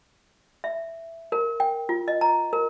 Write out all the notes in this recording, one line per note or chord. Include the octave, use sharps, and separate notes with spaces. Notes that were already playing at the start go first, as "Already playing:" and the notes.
E5
A#4
G5
F4
D#5
A#5
A#4